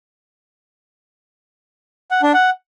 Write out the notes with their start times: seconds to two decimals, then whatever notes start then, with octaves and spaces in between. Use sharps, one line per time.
2.11 F#5
2.23 D4
2.34 F#5